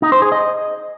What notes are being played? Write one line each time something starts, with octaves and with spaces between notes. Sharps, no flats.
D#4
C5
G#4
D#5